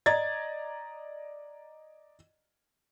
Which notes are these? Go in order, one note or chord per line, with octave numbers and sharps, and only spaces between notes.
D5 D#5 A#5 G#6 A6